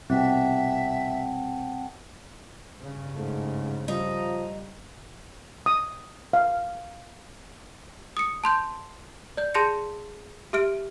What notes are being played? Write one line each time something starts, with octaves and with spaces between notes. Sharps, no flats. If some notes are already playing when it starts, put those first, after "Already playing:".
C2 B2 C4 E5 F#5 G5 A5
G2 C#3
G#2 A3
F3 G3 D#4 F4 D#5
D#6
F5
D#6 C#7
A5 C6 G6
D5 G6
G#4 A5 C6 G6 A#6 C#7
G4 E5 F6 D7